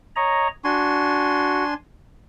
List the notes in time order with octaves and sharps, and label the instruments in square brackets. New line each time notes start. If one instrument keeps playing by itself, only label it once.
[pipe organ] C#5 D#5 A#5
[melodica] D4 G#5 C6 [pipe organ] F#4